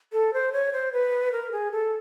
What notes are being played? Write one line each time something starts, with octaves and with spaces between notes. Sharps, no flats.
A4
C5
C#5
C5
B4
A#4
G#4
A4